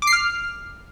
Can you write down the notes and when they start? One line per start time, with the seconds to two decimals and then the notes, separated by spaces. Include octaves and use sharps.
0.02 D6
0.07 C7
0.13 F6